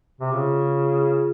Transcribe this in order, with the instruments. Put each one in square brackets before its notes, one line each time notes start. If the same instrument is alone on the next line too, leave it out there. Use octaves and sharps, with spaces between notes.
[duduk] C3
[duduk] C#3 [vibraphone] F4
[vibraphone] F4 G#4
F4 G#4